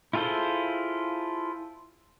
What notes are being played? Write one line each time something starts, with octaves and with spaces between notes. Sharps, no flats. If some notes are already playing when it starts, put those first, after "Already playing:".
E4 F4 G#4 A4 C5